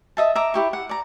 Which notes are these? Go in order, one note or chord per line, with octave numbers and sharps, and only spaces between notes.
D#5 E5 A5
E5 A#5 D6
E4 G4 C#6
F#5
D5 A#5